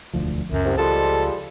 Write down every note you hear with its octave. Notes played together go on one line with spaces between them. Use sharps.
E1 D2 F3
C#2 F#2
C2
F3 G3 G#3 A4